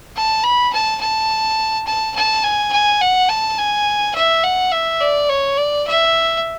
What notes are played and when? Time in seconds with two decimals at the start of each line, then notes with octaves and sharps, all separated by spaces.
0.16 A5
0.44 B5
0.73 A5
1.01 A5
1.87 A5
2.15 A5
2.44 G#5
2.72 G#5
3.01 F#5
3.29 A5
3.58 G#5
4.15 E5
4.44 F#5
4.72 E5
5.01 D5
5.29 C#5
5.57 D5
5.87 E5